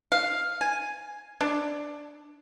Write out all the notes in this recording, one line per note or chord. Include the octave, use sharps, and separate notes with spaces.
F5
G#5
D4